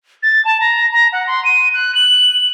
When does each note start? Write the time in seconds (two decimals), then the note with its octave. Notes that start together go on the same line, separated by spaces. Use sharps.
0.23 A6
0.45 A5
0.60 A#5
0.92 A#5
1.13 F#5
1.27 C6
1.45 D#7
1.74 F#6
1.95 F#7